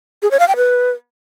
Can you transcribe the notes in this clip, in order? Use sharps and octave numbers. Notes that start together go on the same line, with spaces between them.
G#4
C#5
F5
G5
B4